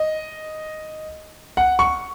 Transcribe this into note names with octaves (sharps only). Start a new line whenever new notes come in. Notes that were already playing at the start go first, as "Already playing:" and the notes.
Already playing: D#5
F#5
C#6